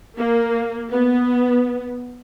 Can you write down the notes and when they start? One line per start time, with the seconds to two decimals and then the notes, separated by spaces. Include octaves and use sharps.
0.18 A#3
0.92 B3